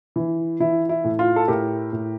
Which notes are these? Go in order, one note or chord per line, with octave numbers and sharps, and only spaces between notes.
E3
E3 E4
E4
A2
F4
A4
A2 G4 A#4
A2